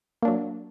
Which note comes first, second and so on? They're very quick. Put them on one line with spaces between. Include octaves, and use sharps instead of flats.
A#3 D4 F#3